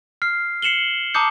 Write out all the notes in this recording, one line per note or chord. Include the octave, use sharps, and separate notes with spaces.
F6 C7
C7 C#7 E7 F#7 G7
A5 A#5 D6 D#6 G6 C#7